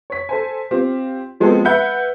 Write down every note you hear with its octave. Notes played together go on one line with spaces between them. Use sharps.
C#5 B6
A4 C5 G#5
C4 F4 G4
F3 G#3 B3 C4 G#4 A4
B4 E5 F#5 B5 G6